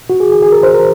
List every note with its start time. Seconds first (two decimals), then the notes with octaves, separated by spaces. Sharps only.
0.10 F#4
0.20 G#4
0.32 G#4
0.42 G#4
0.52 A#4
0.63 C5
0.74 A#4